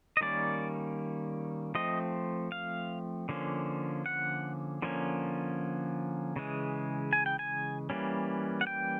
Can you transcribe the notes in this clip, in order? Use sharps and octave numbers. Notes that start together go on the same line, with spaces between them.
D#5
D#3 G3 A#3 C#4 D5
F3 A3 C4 D#5
F5
D3 F3 A#3 C#4
F#5
D3 F3 A#3 C#4
C#3 E3 G#3
G#5
G5
G#5
E3 G3 A#3 C#4
F#5
G5